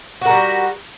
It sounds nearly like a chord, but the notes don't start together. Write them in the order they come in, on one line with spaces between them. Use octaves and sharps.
F#4 A#4 G3